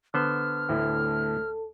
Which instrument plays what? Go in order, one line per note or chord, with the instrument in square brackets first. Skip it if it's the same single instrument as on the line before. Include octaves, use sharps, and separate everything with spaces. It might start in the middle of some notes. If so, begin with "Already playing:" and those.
[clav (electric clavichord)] D3 B3 C5 [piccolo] F6
[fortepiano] D2 A2 [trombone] A4